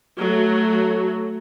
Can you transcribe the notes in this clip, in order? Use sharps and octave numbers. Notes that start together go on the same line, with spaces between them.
F#3 A3